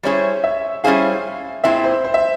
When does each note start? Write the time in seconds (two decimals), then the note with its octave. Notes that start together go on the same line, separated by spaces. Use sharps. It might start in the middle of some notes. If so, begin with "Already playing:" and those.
0.03 G3 C#4 E4 G#4 C5 C#5
0.44 E5
0.84 G3 C#4 E4 G#4 C5 F5
1.64 A#2 G#3 C4 E4 E5
1.84 C5
2.04 C5
2.14 E5